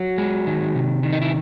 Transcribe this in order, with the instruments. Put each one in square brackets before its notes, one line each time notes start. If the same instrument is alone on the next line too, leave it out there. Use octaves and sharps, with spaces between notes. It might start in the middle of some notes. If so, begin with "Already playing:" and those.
Already playing: [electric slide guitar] F#3 F#4
G#3
D#3
C3
D#3
D#4
E4